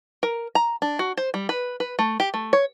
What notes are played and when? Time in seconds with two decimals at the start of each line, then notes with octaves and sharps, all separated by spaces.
0.23 A#4
0.55 A#5
0.82 D4
0.99 F#4
1.17 C5
1.34 G3
1.49 B4
1.80 B4
1.99 A3
2.20 G4
2.34 A3
2.53 C#5